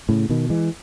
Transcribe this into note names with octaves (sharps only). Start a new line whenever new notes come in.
A2 C#3
B2 D#3
E3 G#3